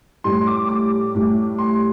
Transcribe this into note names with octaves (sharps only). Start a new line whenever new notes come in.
A2 G3 C6
D6
D6
A2 G3
C6